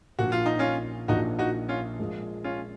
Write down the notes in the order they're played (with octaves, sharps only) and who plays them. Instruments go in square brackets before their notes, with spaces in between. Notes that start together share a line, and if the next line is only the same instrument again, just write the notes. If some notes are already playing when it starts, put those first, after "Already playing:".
[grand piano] A#1 A#2 F3 [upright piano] F#4
[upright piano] F4
D#4
C#4 F4
[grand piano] A#1 A#2 F3 [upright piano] D#4 F#4
[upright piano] D#4 F#4
C#4 F4
[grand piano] A#2 F3 G#3
[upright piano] C#4 F4